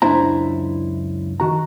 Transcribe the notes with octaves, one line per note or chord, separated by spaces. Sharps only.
C#2 F#2 D4 E4 C5 A#5
D#3 F#4 A#5